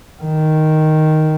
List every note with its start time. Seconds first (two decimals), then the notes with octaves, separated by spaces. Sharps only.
0.23 D#3